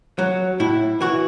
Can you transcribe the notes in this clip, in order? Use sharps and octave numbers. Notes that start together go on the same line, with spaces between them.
F#3
A2 E4
E3 F#4